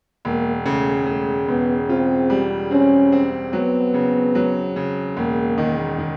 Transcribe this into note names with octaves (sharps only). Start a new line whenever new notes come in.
E1 A#3
C#3 A3
C#3 A3
E1 B3
C4 F4
G3
C4 C#4
C4
F#3 B3
C#3
F#3
C#3
E1 A#3
D#3
D#3